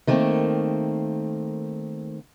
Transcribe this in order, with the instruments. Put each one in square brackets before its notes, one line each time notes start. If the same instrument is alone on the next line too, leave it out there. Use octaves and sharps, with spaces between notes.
[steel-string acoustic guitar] D#3 A3 A#3 C4